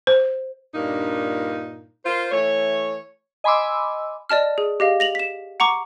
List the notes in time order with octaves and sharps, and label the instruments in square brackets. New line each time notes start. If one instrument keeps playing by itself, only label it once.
[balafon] C5
[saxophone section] G2 A#2 A#3 D4 D#4
F4 A#4 C5
E3 A3 C#5
[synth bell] D#5 G#5 B5 C6 D6 E6
[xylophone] D5 D#5 A5 F6
G#4
G4 D#5 F5
A#6 F7 F#7
B6 E7
F#5 A#5 C#6 D6